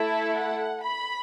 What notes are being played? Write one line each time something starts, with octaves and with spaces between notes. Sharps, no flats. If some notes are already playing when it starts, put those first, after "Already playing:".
Already playing: A3 E4 A4 E5
F#5
B5